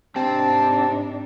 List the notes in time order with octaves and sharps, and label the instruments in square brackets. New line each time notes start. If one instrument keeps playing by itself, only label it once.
[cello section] G#2 D4 D#4 [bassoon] C3 [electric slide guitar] C4 G5 [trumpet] A5